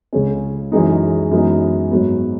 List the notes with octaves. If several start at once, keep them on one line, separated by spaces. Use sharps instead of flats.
C#2 C#3 G#3 C#4
F#2 E3 G#3 D#4
F#2 E3 G#3 B3 D#4
G#2 F#3 B3